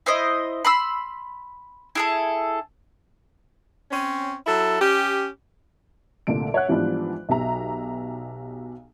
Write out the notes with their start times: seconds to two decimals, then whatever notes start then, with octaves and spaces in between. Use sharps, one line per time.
0.06 E4 C5 D#5
0.65 B5 C6 E6
1.95 E4 G#4 A4
3.91 C4 C#4
4.47 F#3 E4 A4
4.80 C#4 G4
6.27 C2 A#2 D3 A3 D7
6.54 C#5 E5 F#5 F#6
6.69 G#2 E3 F3 G3 B3 D4
7.29 B1 B2 F#3 G4 E5 A#5